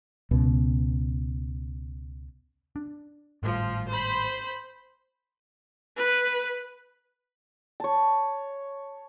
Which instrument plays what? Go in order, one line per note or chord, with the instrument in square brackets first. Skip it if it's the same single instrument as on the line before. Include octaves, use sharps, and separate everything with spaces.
[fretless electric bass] C#2 B2
[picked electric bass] D4
[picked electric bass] G#1 A2 G3 [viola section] F3
[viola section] C5 B5
[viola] B4
[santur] C#5 A5